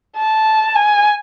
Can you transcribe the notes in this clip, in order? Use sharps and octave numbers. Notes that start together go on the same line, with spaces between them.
A5
G#5